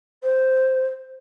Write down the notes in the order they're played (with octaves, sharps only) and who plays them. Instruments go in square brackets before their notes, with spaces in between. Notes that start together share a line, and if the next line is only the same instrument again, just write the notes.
[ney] C5